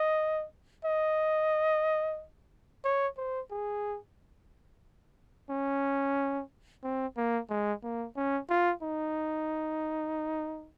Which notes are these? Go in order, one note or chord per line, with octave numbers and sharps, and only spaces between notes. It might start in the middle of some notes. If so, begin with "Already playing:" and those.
Already playing: D#5
D#5
C#5
C5
G#4
C#4
C4
A#3
G#3
A#3
C#4
F4
D#4